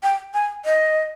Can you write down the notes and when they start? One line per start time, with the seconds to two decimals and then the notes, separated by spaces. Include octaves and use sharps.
0.03 G5
0.34 G#5
0.65 D#5